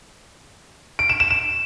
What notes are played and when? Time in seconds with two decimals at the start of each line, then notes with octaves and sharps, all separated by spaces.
0.99 D7
1.10 E7
1.20 E7
1.31 E7